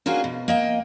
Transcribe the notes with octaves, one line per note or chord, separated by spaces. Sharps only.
A#3 C#4 D4 F4 F#4 G#4
B2
A#3 D#5 G5